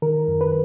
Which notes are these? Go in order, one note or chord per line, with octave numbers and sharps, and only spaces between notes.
D#3 A#4
F#2
B4